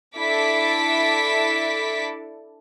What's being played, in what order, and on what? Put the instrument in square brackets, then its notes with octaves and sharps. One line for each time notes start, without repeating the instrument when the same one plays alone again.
[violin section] D4 E4 A4 D6 B6